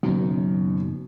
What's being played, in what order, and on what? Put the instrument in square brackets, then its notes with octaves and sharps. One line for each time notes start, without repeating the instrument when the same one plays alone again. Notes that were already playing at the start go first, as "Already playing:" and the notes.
[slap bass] F#1 B2 D#3 [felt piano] F#2